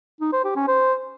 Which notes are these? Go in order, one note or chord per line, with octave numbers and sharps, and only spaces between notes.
D#4
C5
G4
C#4
C5